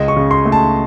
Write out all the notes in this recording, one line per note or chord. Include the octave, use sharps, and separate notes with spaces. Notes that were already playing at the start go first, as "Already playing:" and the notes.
Already playing: C#2 D#5
C#6
C#3
C6
A3
A5